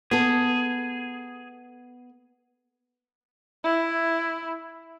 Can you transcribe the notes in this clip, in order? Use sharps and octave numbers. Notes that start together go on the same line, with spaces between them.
B3 G#4 A4
E4